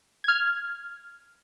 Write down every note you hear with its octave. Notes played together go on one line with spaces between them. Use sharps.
F6 G#6